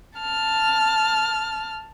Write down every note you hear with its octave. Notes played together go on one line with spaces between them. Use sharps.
A5 F6